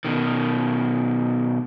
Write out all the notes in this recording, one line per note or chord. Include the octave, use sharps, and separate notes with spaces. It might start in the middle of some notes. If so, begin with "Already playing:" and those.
B2 D#3